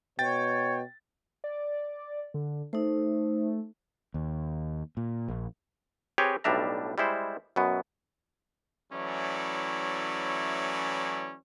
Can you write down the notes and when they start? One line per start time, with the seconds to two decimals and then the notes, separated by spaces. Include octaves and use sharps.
0.19 B2 C#5 G5 A6
1.44 D5
2.34 D3
2.73 A3 D#4 C5
4.14 D#2
4.97 A#2
5.28 A#1
6.18 C4 G4 G#4 B4 C#5
6.44 B1 A2 G3 D4 E5 A#5
6.98 G3 G#3 E4 C5
7.56 F#2 B2 B3
8.91 E3 F#3 A3 C#4 E4 D5